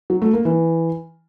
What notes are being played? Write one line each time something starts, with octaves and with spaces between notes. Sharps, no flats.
F#3
A3
A#3
E3